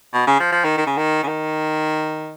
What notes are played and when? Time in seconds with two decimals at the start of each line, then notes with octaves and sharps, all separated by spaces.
0.14 B2
0.27 C#3
0.40 F3
0.52 F3
0.64 D#3
0.77 D#3
0.86 C#3
0.97 D#3
1.23 C#3
1.27 D#3